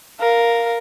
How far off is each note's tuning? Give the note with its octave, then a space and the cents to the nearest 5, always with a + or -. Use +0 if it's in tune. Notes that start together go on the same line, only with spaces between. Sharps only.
A#4 +0 F5 +0